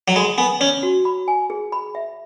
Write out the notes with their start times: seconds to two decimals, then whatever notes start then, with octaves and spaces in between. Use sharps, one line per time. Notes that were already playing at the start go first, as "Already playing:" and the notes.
0.08 F#3
0.16 G#3 B5
0.38 B3 G#5
0.60 C#4 C#5
0.83 F#4
1.05 B5
1.28 G#5
1.50 G#4
1.72 B5
1.95 E5